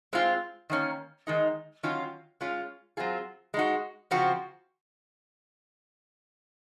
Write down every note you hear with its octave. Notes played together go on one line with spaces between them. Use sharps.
G#3 C4 F4
D#3 A#3 C#4
D#3 G#3 D#4
D#3 F#3 C#4 F4
G#3 C#4 F4
F#3 C4 F4 G#4
G#3 D#4 F#4
C#3 F3 C4 F#4